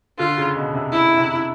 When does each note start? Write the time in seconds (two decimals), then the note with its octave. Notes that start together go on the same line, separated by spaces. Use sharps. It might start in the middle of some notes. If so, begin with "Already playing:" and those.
0.19 D3 F4
0.38 C#3
0.56 B2
0.74 C3
0.92 E4
1.17 C3